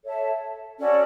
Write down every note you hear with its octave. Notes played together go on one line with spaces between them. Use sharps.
A4 C#5 E5 A5
C#4 F#4 A4 D5